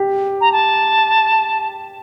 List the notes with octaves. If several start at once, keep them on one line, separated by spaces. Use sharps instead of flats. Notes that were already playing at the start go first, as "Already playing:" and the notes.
Already playing: G4
A#5
A5